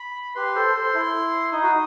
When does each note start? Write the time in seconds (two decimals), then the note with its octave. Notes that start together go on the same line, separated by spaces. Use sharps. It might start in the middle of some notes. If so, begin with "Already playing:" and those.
Already playing: B5
0.35 G4 B4 C6
0.55 A4 C5
0.75 A4 C5
0.94 E4
1.52 D#4 D#6
1.63 F#4